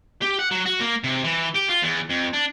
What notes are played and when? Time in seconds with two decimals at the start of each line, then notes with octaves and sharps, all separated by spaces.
0.22 G4
0.39 F#5
0.51 F#3
0.66 F#4
0.80 A#3
1.04 C3
1.24 E3
1.55 G4
1.69 F4
1.83 E2
2.10 F2
2.34 D4